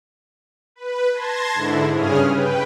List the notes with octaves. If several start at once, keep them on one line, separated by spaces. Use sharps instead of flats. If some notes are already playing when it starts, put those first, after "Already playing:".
B4
A5 C6 G#6 A#6
G#2 D3 E4
G2 C#3 C#4 G#4 D#6 F6
B4 G5